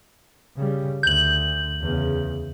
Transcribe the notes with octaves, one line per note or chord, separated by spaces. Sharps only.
C#3 G3
D2 G6 F#7
E2 C#3